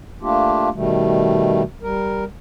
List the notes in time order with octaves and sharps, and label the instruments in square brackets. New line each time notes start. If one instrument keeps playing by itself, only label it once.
[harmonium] A3 A#3 D4 F4 G4
B2 D#3 G3 A3
G3 A#4